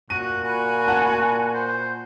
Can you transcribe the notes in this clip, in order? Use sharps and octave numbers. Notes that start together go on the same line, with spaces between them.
A#2 F#4 D#7
F#4 G#5 B5
F#5 A5 F#6
C5